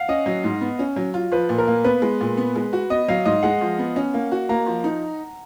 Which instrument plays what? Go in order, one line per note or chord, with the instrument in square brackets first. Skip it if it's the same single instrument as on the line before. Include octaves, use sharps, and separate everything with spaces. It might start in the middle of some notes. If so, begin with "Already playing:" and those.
Already playing: [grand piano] F5 F#5
[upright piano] C#4 [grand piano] D#5
[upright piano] F#3
G#2
B3
C#4
F#3
F4
[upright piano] F3 [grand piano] B4
[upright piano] A#2
[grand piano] A#4
[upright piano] A#3
[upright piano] B3 [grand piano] B4
[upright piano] G#3
A#2
B3
G#3
F#4
[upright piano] B3 [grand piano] D#5
[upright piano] F#3 [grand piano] F5
[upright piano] G#2 [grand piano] D#5
[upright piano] G#3 [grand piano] F#5
[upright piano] F3
B3
C#4
A#3
F#4
[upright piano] A#3 [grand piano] A#5
[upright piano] F3
D#4